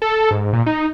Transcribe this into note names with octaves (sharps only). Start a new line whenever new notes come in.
A4
G#2
A#2
D#4